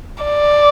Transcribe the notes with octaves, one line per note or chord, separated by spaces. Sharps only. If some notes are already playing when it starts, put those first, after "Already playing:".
D5